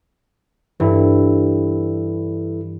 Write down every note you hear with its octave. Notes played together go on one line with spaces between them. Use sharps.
G2 E3 E4 A4